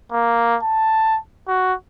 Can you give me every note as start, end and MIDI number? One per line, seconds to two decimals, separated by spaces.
0.12 0.57 58
0.63 1.18 81
1.48 1.74 66